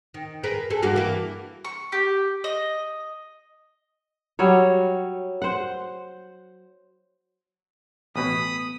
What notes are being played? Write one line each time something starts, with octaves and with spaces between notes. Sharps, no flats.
D#3
G#4 A#4 B4
G#4 A4
G2 A#3 F#4
E3 A#3
C#6
G4
D#5
F#3 G3 C#5
C5 F#5
A1 B2 B5 D#6